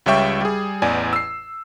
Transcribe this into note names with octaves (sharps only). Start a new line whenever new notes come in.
C#2 G3 C#5 E5 G5 C#6
G3 G#4
A1 E2 D5 G#5
E6 C7